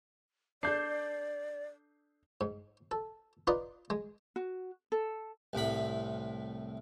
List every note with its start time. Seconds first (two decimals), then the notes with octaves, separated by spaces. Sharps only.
0.63 D4 A4 D5 G6 C7
2.41 G#2
2.91 A4
3.47 D#4 F4 B4 D5 D#5
3.90 G#3
4.36 F#4
4.92 A4
5.53 C2 A2 B5